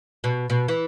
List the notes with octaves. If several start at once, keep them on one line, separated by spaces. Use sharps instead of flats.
B2
B2
E3